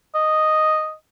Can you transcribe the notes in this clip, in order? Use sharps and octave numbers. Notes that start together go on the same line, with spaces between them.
D#5